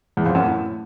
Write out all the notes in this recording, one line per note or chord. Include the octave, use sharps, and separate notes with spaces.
E2
F2
F#2
A2